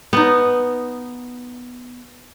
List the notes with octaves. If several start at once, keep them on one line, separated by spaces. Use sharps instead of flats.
B3 D#4